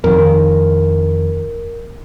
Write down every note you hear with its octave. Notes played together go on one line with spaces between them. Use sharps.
F2 D#3 A#4